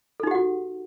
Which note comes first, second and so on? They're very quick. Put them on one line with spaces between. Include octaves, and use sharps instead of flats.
A4 D#4 G4 F#5 F#4